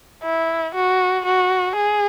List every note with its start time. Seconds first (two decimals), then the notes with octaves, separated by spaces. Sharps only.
0.23 E4
0.75 F#4
1.26 F#4
1.77 G#4